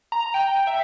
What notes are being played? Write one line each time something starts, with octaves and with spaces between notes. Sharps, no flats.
A#5
G5
E5